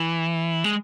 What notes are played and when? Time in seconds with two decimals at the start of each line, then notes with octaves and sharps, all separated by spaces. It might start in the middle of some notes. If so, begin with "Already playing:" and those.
Already playing: E3
0.64 G#3